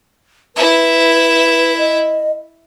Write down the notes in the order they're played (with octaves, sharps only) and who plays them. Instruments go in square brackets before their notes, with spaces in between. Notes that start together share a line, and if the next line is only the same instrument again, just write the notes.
[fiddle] E4 E5 [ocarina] B4
[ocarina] D#5